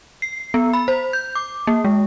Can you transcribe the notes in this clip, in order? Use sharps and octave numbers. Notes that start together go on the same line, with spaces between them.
C7
B3
B5
C5
G6
D6
A#3
G#3